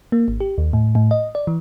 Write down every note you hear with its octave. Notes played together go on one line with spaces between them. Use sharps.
A#3
G#1
G4
D#2
A2
A2
D#5
D5
E3